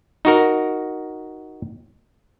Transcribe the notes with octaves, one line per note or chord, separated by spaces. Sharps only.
D#4 F#4 A#4